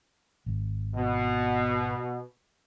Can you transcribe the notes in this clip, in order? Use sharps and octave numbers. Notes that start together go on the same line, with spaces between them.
G#1
B2